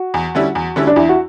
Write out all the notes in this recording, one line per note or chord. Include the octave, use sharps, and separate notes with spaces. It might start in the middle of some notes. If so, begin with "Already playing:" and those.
Already playing: F#4
E2
D3 G3 C#4 E4
E2
D3 G3 C#4 E4
D4
E2 E4
F#4